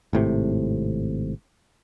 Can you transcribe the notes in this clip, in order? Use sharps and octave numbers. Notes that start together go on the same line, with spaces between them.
G#1 A2 C3